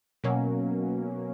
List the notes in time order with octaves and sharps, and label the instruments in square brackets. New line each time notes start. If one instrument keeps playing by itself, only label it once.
[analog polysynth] B2 F#3 A#3 C#4